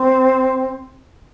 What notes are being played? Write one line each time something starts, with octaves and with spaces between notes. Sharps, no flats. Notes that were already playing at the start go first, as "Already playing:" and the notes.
Already playing: C4